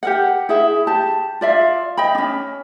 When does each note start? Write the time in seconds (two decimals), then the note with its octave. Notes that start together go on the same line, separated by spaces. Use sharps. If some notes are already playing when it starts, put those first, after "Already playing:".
0.03 G4 A#4 F#5
0.49 E4 G#4 E5
0.87 G4 A5
1.41 F4 D5 E5 F5
1.97 D#5 G5 B5
2.15 C#4 D4